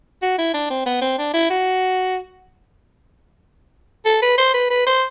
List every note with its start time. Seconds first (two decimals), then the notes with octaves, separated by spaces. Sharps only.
0.22 F#4
0.38 E4
0.54 D4
0.70 C4
0.86 B3
1.01 C4
1.18 D4
1.34 E4
1.50 F#4
4.05 A4
4.22 B4
4.38 C5
4.54 B4
4.70 B4
4.86 C5